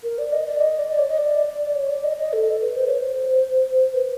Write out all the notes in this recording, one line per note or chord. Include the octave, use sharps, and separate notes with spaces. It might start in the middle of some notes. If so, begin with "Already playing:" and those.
A#4
D5
D#5
D5
D#5
D5
C#5
D#5
D5
C#5
D5
D#5
D#5
A4
B4
C5
C#5
C5
B4